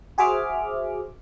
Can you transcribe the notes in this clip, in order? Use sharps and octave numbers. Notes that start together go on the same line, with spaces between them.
F#4 G#4 C5 E5 D6 F6